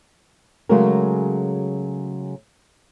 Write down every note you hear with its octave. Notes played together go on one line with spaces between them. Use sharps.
C#3 F#3 G#3 A3 F#4 A#4